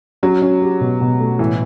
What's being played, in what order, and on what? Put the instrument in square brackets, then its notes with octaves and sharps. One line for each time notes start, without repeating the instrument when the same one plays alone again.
[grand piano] F#3 [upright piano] C#4
[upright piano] C#4
G4
B2
B2
A3
[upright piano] A2 [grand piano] E3